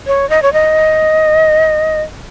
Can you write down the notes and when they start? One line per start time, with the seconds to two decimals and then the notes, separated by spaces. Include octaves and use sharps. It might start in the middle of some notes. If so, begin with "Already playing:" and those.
0.07 C#5
0.30 D#5
0.42 C#5
0.53 D#5